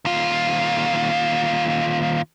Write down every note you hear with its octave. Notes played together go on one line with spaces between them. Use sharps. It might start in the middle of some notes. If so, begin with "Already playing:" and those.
D#2 F4